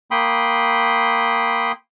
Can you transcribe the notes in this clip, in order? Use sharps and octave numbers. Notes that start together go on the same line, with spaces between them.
A#3 G5 B5 C6 D#6